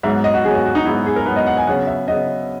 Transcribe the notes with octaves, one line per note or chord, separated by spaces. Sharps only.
G#2 F#3 B3 E5
D#5
F#4
G#2 F#3 B3 G#4
F#4
F#4
D#4
G#2 F#3 B3 E4
G#4
A#4
G#2 F#3 B3 B4
D#5
F#5
G#5
C#3 F#3 B3 F#5
E5
C#3 F#3 B3 D#5